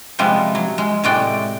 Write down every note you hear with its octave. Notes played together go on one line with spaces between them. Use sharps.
C3 F3 G3 G#3 B3
F#3
G#3
A2 C3 G#3 F#4 D5 G5